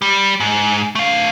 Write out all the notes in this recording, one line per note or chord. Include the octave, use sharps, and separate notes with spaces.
G3
G#2
A3 F5